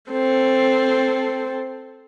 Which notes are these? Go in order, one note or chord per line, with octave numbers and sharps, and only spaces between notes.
C4 A4